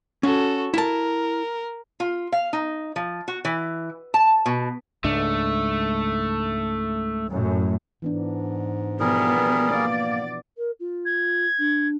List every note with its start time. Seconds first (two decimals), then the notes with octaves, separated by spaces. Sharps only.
0.23 C#4 F#4 A4
0.74 E4 A#4 A5
2.00 F4
2.32 F5
2.53 D#4
2.96 F3
3.28 F#4
3.45 E3
4.14 A5
4.46 B2
5.04 C#2 G#2 A3 D4
7.31 F#2 A2
8.02 G#2 E3 B3 D4
9.00 B2 F3 G3 B3 E4 G#4 A#4
9.71 A#3 B3 D5
10.57 A#4
10.79 F4
11.06 G#6
11.58 D4